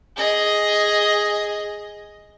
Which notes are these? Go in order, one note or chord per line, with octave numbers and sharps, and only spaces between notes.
G#4 D#5